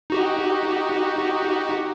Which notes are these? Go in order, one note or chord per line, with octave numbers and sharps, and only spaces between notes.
D#4 F#4 G4